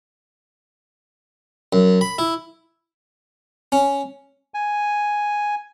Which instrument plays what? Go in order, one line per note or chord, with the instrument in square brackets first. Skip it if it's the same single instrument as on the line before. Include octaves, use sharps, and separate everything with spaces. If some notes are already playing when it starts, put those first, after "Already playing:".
[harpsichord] F#2
B5
E4
C#4
[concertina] G#5